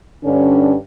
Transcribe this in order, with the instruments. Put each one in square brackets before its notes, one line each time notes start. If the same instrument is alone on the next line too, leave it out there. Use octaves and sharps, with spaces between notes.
[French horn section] G2 D3 C#4